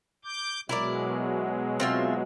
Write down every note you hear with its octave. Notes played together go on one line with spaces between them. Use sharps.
D6 G6
B2 F#3 G#3 E4 A#4 D5
C4 F4 E5